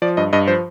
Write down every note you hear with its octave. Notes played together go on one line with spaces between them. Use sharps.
F3 D5
G2 D#5
G2 D#5
F3 C5